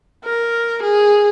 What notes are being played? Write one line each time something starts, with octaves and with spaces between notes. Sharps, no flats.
A#4
G#4